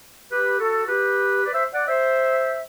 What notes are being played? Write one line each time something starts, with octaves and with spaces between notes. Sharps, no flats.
G4 B4
F#4 A4
G4 B4
B4 D5
C5 E5
D5 F#5
C5 E5